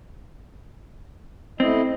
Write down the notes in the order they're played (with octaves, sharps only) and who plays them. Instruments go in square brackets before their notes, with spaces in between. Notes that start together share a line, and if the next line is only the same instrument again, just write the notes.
[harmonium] A3 E4 D#5 [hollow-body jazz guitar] C4